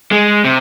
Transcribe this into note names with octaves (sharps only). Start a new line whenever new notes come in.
G#3
C3